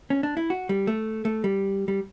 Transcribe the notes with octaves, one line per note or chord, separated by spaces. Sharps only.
C#4
D4
E4
F#4
G3
A3
A3
G3
G3